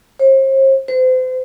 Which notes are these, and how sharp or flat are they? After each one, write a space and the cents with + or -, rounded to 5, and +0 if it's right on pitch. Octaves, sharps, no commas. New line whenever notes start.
C5 +40
C5 -35